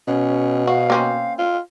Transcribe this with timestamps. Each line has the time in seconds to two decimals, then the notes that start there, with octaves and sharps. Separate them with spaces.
0.07 B2 C#4
0.67 F#4 F5
0.90 A#3 C4 C#4
1.38 F4